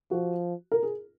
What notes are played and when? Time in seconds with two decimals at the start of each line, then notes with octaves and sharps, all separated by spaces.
0.11 F3 F#4
0.72 A#4
0.83 G#4